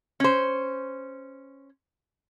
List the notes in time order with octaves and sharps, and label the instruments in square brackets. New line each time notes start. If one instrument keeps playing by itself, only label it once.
[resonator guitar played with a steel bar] C#4 C5